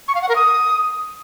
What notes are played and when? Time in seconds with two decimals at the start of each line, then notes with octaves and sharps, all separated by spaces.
0.08 C#6
0.15 F5
0.22 F#5
0.29 A#4
0.36 D#6